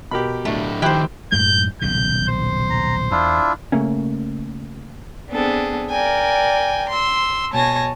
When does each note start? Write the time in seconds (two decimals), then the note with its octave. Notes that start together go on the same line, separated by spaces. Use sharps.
0.11 B2 G4 A#4 B5
0.45 A2 A3 D4
0.82 D#3 F3 E4 G4 C5 G5 D6 F#6
1.32 F#2 A2 G#3 G6
1.82 D#1 B1 C#3 G6
2.29 C5
2.70 A#5
3.11 E2 D4 E4 F4
3.72 C#3 A3 A#3 C#4
5.29 B3 C4 D4 G#4 A4
5.90 A#4 D5 G5 G#5
6.90 C6 E6
7.52 B2 C#5 G#5 A5 A#6